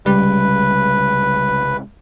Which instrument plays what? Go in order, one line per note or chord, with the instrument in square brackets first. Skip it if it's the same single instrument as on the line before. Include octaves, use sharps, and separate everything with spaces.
[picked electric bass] C2 C#3 G#3 [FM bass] G3 [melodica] B4